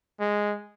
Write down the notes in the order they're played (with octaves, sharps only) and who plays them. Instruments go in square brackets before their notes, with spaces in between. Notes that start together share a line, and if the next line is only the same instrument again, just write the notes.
[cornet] G#3